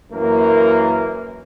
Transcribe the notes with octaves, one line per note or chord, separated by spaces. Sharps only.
F#2 E3 A#3 A#4